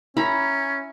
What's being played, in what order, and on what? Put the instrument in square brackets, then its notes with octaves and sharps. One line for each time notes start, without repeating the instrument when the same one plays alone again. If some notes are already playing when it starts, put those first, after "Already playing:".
[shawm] C#4 [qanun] E4 A#5 B5